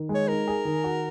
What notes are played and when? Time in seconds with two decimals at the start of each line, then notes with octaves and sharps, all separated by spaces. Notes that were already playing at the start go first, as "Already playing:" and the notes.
Already playing: D#3
0.09 G#3
0.14 C#5
0.28 D#4 A#4
0.48 G#4
0.65 D#3
0.84 F#4